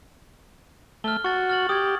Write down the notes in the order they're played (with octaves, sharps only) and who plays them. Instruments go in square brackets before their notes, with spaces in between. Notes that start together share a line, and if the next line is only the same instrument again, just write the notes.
[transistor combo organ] A3 [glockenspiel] F6 G7
[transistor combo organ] F#4 [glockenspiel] C#6 A6
[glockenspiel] F6 A6 F#7
[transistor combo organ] G4 [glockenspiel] D#6 G#6